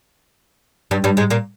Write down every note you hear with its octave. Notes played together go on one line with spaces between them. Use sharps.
G2 G3
G2 G3
G#2 G#3
A#2 A#3